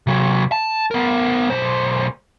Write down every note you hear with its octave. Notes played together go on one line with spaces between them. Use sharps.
C3 F#3
A5
B3 A#4
B1 C5